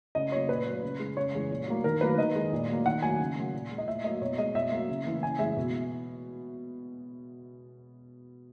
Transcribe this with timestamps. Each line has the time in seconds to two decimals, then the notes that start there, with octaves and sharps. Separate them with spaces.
0.15 C#3 D#5
0.31 F#3 A#3 C#5
0.49 A#2 B4
0.66 F#3 A#3
0.83 C#3
1.00 G#3
1.17 C#3 C#5
1.34 E3 G#3
1.50 A#2
1.67 F#3 A#3
1.84 D#3 A#4
2.01 F#3 A#3 B4
2.18 D#3 D#5
2.35 G#3
2.53 A#2
2.69 F#3 A#3
2.85 D#3 F#5
3.02 F#3 A#3 G#5
3.19 C#3
3.36 F#3 A#3
3.54 A#2
3.71 G#3
3.78 D#5
3.88 A#2 E5
4.04 F#3 A#3 D#5
4.21 B2 C#5
4.38 G#3 D#5
4.55 B2 E5
4.72 F#3 A#3
4.89 C#3
5.06 E3 A#3
5.23 C#3 G#5
5.39 E3 G#3 E5
5.57 B2